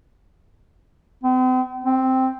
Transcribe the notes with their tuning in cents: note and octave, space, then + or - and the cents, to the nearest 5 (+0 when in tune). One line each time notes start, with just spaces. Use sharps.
C4 -40
C4 -5